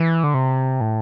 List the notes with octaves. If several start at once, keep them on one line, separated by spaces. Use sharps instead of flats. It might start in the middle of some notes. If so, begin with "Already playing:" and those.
Already playing: E3
D3
C3
A2